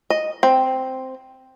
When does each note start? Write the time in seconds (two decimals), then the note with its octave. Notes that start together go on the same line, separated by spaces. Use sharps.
0.10 D#5
0.43 C4